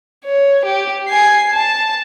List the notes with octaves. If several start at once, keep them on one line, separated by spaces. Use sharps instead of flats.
C#5
G4
G#5 C7
A5